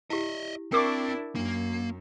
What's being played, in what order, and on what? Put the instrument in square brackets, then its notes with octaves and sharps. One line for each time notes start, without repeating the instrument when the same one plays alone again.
[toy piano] E4 G4 [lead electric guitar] D#5 E5
[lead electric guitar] C4 [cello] D4 E4 [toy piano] A#4 G5 [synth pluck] C#6 D6 C7
[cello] F#2 [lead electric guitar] A#3 [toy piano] D4